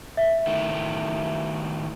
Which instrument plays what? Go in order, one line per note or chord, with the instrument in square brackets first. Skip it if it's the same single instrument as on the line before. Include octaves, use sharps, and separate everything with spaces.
[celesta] E5
[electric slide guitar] D#3 A3 E4